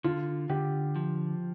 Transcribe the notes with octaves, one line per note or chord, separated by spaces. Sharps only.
D3 F4
D3 G4
F3